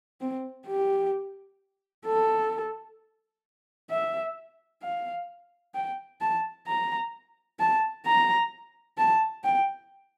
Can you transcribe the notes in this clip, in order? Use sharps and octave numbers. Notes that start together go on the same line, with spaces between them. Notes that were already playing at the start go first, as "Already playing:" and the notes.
C4
G4
A4
E5
F5
G5
A5
A#5
A5
A#5
A5
G5